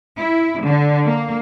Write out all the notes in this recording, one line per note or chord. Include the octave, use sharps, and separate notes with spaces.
E4
D3
A#3